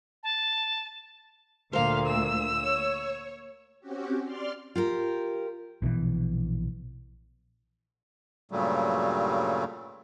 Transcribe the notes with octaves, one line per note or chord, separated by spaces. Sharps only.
A5
D2 A#2 A#3 C5 F5
E6
C#5
C4 C#4 F#4 G4
D5 C6 F6
F4 G4 A#4
A#1 B2 D#3 E3
G2 A#2 C#3 F#3 G3 A3